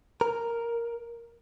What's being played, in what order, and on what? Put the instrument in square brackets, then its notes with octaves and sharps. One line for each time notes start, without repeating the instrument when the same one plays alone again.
[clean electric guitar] A#4